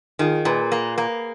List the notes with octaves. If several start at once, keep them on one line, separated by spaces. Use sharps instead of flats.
D#3 F4 G#4
A#2 G#4 B4
A#3
A#3